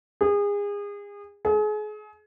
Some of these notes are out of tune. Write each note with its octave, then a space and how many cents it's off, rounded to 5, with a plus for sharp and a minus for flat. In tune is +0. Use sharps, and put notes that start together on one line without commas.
G#4 -30
G#4 +35